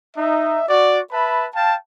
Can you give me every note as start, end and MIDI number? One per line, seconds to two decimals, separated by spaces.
0.17 0.64 63
0.17 0.64 76
0.69 1.00 66
0.69 1.00 74
1.12 1.47 71
1.12 1.47 76
1.12 1.47 81
1.12 1.47 83
1.55 1.75 77
1.55 1.75 79
1.55 1.75 81